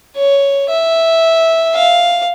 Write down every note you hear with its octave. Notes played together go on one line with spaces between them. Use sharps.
C#5
E5
F5